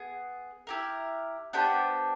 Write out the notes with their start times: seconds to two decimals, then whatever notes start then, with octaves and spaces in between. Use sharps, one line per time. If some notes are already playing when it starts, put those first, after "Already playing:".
Already playing: B3 G#4
0.67 E4 G4 A#4
1.53 B3 D4 G4 C5